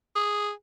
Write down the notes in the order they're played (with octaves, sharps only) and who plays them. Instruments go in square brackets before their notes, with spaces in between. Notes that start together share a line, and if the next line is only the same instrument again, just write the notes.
[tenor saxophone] G#4